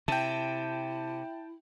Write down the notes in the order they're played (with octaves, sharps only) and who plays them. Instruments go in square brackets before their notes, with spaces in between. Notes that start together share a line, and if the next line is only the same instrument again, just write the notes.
[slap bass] C3 [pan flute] E4 [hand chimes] E5 [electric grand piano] G5 A5